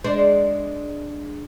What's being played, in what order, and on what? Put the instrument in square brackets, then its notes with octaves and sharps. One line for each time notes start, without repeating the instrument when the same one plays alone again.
[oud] G#3 D4 C5